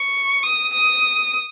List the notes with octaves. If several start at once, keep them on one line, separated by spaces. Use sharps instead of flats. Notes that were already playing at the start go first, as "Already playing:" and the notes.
Already playing: C#6
D#6
D#6